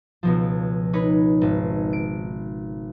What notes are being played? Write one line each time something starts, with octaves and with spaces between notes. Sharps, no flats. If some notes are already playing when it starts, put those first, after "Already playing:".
C#2 B2 F3
D#4 B4 C#5
G#1
D7